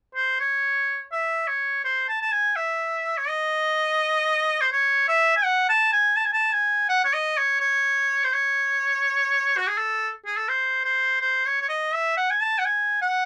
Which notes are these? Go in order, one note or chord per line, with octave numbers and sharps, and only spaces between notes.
C5
C#5
E5
C#5
C5
A5
A5
G#5
E5
C#5
D#5
C5
C#5
E5
G#5
F#5
A5
G#5
A5
G#5
A5
G#5
F#5
C#5
D#5
C#5
C#5
C5
C#5
F#4
G#4
A4
G#4
A4
C5
C5
C5
C#5
C#5
D#5
E5
F#5
G#5
A5
F#5
G#5
F#5